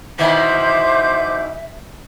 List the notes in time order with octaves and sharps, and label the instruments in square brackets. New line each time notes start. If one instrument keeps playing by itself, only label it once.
[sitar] B2 D#3 E3 [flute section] C5 D6 G6 [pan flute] E5